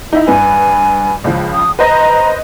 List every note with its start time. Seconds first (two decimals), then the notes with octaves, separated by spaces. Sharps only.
0.13 D#4 E4 E5
0.28 G2 B4 G#5
1.24 C#2 C#3 F3
1.54 D#6
1.79 B4 C5 D#5 A#5